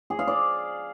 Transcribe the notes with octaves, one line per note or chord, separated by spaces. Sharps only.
G#4
F5
D5